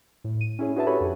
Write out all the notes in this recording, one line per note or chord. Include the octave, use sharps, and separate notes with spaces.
A2
D#7
C#4 E4 G#4 C#5
D4 F#4 G#4 B4 E5 A5
F#4 G4 A4 B4 C#5 B5
F2